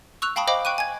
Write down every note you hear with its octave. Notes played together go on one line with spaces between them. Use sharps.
C#6 E6 F#6 F7
F5 G5 A5 B5 C#6 D#6
C5 D#5 F5 G5 B5 D6
G5 C#6 F#6 D#7
G#5 G#6